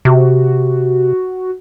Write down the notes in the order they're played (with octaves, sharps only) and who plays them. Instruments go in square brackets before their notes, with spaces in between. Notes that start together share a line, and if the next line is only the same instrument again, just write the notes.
[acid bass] C3 [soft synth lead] F#4